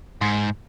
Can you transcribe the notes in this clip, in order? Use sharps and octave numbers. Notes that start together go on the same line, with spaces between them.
G#2